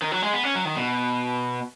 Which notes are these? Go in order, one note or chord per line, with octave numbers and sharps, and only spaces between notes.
D#3
F#3
G#3
B3
C#4
F#3
D#3
B2